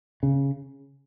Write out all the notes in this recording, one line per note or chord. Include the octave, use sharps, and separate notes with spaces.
C#3